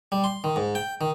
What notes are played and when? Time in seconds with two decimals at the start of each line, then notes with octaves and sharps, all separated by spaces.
0.12 G3
0.24 C6
0.44 D#3
0.56 G#2
0.75 G5
1.01 D#3